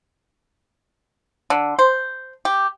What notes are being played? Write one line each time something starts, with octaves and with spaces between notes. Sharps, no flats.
D3
C5
G4